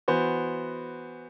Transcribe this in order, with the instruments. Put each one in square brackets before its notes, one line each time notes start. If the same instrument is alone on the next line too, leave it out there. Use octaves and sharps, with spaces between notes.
[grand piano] E3 B3 F#4 C5